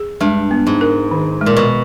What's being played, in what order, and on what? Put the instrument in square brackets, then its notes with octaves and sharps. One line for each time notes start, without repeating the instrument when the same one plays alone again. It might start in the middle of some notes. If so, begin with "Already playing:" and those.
Already playing: [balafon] G#4
[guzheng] G2 [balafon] G#3
[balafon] B3
[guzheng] G#2
[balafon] A#4
D#3
G#3
[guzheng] A#2
B2